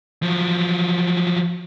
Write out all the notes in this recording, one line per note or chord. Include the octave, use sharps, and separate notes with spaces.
F3 F#3